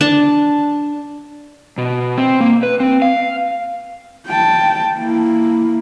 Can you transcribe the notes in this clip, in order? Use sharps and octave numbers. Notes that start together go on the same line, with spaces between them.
D4 A5
B2
C4
A#3
B4
C4
F5
G5 A5
A#3 E4